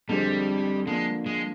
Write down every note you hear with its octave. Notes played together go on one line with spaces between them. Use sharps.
F2 D3 G3 G#3 C4
D3 F3 G#3 A#3
G#3